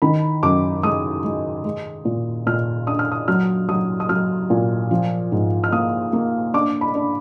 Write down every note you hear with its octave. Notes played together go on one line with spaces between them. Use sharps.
D#3 B5
F#2 D6
G#3 D#6
G#3
G#3
A#2
A#2 F6
D4 D#6
F6
D#6
F#3 F6
F#3 D#6
D#6
F#3 F6
A#2
F3
G#2
F6
A#3 D#6
A#3
D4 D6
B5
D4